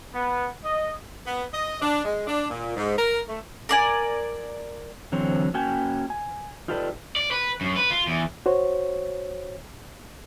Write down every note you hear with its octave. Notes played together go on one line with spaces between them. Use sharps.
B3
D#5
B3
D#5
D4
G#3
D4
A#2
G#2
A#4
A3
A#4 D5 G#5
D3 E3 F#3 C4 C5 C#5
A#3 C#4 F#4 G5 G#5
G#5
D#4 F4 G4 A4 B4 D5
D5
B4
F#2
B4
F4
E2
F#4 C5 C#5